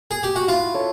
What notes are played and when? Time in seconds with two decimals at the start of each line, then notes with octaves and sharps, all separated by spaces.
0.11 G#4
0.23 G4
0.36 F#4
0.48 E4 F4
0.74 A4 C#5